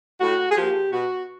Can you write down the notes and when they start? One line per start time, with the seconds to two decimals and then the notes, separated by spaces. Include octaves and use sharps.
0.21 A2 F#4
0.51 G#4
0.56 F3 A#3 G4
0.92 B2 F#4